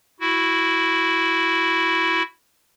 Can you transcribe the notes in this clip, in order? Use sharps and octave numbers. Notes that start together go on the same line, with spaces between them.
E4 F#4